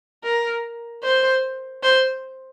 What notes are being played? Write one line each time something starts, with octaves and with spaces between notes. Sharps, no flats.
A#4
C5
C5